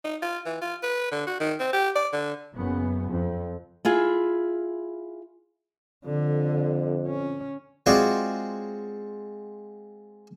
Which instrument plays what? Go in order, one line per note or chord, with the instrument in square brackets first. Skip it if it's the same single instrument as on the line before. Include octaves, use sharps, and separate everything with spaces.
[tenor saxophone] D#4
F4
E3
F4
B4
D3
F#4
D#3
C4
G4
D5
D3
[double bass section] F#1 F#2 C#3 B3
F2
[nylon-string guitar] E4 F4 G#4
[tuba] F2 [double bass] D3
[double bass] C#4
[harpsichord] G#3 C4 F4 F#4 C#5 D5